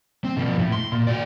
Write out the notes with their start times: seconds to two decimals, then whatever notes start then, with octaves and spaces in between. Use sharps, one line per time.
0.25 C4
0.37 B2 F3
0.59 A2
0.72 C6
0.92 A#2
1.07 F#4 D5